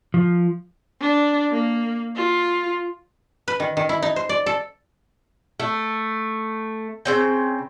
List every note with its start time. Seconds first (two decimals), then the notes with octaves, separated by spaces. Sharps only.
0.14 F3
1.01 D4
1.51 A#3
2.16 F4
3.48 B4
3.60 D#3
3.77 D#3
3.89 E4
4.02 D#4
4.16 C5
4.29 D5
4.46 A4
5.60 A3
7.05 C#3 C4 G5